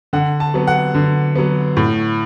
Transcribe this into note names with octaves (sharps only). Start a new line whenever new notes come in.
D3 F#5
A5
F#3 B3
F#5
D3
F#3 B3
A2